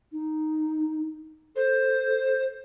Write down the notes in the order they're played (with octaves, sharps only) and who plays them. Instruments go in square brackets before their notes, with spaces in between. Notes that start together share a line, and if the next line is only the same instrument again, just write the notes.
[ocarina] D#4
[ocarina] A4 [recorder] C5